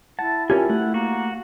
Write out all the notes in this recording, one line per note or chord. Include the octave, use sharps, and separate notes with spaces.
E4 F#5 A5
C#4 F4 G4 A#4 G#5
A3 F#5
A#3 F#4